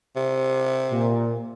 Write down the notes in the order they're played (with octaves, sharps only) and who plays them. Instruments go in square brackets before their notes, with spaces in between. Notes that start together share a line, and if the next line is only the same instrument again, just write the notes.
[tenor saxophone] C3
[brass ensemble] A#2